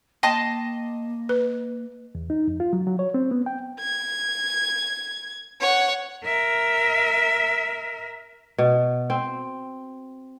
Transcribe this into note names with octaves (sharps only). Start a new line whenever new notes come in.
A#3 D#5 G5 A5 C6
B4
E2
D#4
F2
F4
F#3
F#3
C#5
C4
B3
G5
G#6
C#5 F#5
A#4 E5
B2
C4